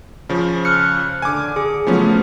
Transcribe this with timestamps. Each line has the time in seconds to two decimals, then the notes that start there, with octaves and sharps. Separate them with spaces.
0.29 C#3 F3
0.65 F6 F#6 C#7
1.22 D3 G#5 D6 F6
1.56 G#4 D6
1.87 C#3 F3 F#3 A3 B3 C#4